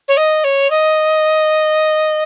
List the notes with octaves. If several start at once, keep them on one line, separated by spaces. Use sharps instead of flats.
C#5
D#5
C#5
D#5